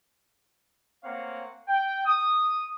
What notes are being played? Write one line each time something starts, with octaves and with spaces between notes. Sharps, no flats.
A3 A#3 C4 C#5 F5 F#5
G5
D#6